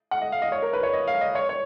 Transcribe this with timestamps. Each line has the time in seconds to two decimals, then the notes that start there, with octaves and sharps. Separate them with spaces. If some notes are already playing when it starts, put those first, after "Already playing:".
0.11 F#5
0.22 D#5
0.32 F5
0.42 D#5
0.52 C#5
0.62 A#4
0.73 B4
0.83 C#5
0.93 D#5
1.07 F5
1.21 D#5
1.35 C#5
1.49 C#5